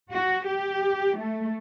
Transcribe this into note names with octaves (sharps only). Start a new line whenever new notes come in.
F#4
G4
A3